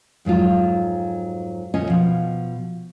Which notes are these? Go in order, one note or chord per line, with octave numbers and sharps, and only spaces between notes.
F2 G#2 F#3 F4
D2 A#2 C#4 F4 D#5 G#5
B2 F3